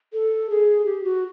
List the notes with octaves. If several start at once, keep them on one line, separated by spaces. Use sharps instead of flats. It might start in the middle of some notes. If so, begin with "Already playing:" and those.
A4
G#4
G4
F#4